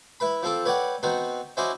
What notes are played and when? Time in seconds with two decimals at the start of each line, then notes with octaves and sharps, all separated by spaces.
0.20 E4 B4 B5
0.43 F3 C4 A4 D6
0.65 B4 C#5 D5 F#5 G5
1.03 B3 C4 D#4 F#4
1.57 C#4 E4 F#4 C5 D5 D#5